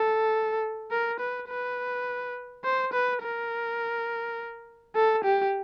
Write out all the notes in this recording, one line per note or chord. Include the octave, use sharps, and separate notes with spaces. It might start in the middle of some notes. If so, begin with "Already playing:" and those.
Already playing: A4
A#4
B4
B4
C5
B4
A#4
A4
G4